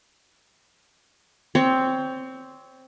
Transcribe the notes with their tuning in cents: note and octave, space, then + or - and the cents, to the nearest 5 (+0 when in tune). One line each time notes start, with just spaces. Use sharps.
C4 +0 C#5 +25